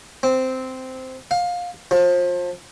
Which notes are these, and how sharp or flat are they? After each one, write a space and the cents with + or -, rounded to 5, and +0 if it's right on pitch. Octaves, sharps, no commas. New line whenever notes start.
C4 -10
F5 +20
F3 +30